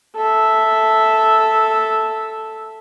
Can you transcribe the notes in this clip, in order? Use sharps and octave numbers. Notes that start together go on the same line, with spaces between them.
A4 E5